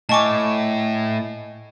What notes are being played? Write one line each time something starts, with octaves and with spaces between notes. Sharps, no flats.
A2 D#5 G#5 A5 C#6 D6